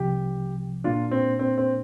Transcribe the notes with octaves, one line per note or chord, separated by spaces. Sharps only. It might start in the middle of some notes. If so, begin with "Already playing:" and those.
Already playing: C2 C3 F3 G4
A#2 A#3 D4 F4
C4
C4
C4